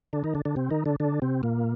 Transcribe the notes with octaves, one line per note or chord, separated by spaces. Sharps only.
D3 D4
D#3 D#4
D3 D4
D3 D4
C3 C4
D#3 D#4
D3 D4
D3 D4
C3 C4
A#2 A#3